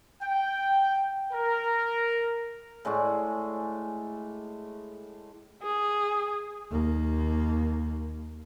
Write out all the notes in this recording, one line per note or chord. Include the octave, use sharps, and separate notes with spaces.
G5
A#4
A2 G#3 D5 C#6
G#4
D#2 A#3